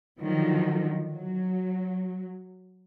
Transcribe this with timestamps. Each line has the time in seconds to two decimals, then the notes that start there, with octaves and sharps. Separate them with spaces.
0.19 D3 D#3 F3 F#3
1.09 F#3